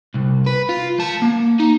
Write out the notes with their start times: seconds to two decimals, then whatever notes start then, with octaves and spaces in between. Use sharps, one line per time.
0.15 C2
0.47 B4
0.69 F4
0.99 G#3 A5
1.22 A#3
1.59 D#4